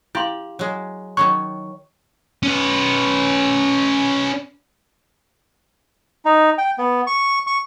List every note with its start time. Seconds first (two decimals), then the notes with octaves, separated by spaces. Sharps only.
0.15 E4 G4 F5 C6
0.59 F#3 G#3
1.17 D#3 F#3 C#5 C#6
2.43 C#4 B4
6.25 D#4
6.58 G5
6.78 B3
7.07 C#6
7.47 C#6